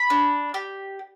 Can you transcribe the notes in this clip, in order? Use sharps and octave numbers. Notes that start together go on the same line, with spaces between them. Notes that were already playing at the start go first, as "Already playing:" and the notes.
Already playing: B5
D4
G4